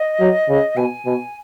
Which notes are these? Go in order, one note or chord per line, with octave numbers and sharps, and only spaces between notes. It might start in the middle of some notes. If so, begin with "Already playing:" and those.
Already playing: D#5
F#3
C#3
B2 G#5
B2